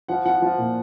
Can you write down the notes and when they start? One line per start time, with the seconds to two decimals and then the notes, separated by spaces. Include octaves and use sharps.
0.08 F3 F#5
0.25 F3 F#5
0.42 F3
0.58 A#2